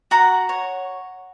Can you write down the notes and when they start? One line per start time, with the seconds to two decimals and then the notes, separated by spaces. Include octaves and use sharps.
0.11 F#4 F#5 A#5
0.49 C#5